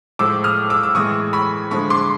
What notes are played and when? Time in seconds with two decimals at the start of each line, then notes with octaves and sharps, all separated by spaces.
0.19 A2 F3 G#3 D6 E6
0.44 D#6 F6
0.70 D6 E6
0.83 E6
0.95 A2 E3 G#3 C#6 D#6
1.33 B5 C#6
1.71 D3 F3 G#3 B5 C#6
1.90 C6 D6